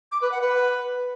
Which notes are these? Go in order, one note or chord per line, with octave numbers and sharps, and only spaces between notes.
D6
B4
F#5
B4